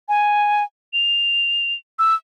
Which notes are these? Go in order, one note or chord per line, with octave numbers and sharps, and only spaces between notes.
G#5
F7
E6